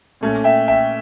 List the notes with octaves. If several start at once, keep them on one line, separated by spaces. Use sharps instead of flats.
A#2 A3 C#4
E5 G5
E5 G5